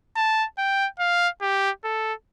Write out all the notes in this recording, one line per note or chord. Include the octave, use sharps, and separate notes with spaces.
A5
G5
F5
G4
A4